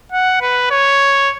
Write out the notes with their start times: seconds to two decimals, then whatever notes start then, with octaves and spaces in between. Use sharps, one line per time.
0.12 F#5
0.41 B4
0.70 C#5